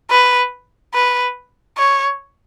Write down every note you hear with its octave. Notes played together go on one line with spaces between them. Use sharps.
B4
B4
C#5